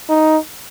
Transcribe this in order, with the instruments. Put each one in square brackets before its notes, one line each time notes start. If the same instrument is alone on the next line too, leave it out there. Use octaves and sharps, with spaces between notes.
[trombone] D#4